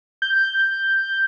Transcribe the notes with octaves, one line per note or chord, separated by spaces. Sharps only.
G6
G6